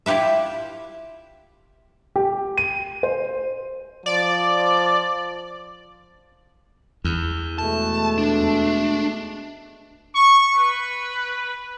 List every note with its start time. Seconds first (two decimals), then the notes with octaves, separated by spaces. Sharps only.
0.06 E4 F4 G4 B4 E5
2.16 G4
2.58 D#7
3.03 C5
4.06 F3 D5
7.04 E2
7.58 B2 G#3 A3 A5
8.18 D4
10.14 C#6
10.53 B4